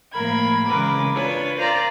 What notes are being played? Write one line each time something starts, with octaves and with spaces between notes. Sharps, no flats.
A2 F3 A#3 A#4 B5 G#6
C#3 E3 G#3 A#4 B4 D6
D4 F4 B4 C#5
F4 A#4 C5 D5 A#5